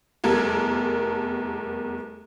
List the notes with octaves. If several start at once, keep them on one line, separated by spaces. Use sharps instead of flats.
F1 E2 G3 A4 A#4 G#6